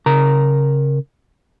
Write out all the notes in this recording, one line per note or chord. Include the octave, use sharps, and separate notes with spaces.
C#3 A#4 A#5